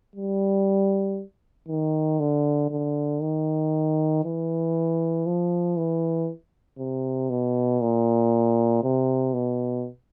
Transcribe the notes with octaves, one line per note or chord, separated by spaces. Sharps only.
G3
D#3
D3
D3
D#3
E3
F3
E3
C3
B2
A#2
C3
B2